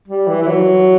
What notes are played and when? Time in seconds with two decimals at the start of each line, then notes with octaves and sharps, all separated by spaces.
0.08 G3
0.28 E3
0.42 E3
0.47 F#3